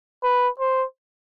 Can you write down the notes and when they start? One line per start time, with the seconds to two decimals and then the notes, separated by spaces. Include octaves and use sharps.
0.23 B4
0.59 C5